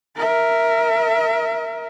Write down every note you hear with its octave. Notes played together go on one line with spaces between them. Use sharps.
A#4 E5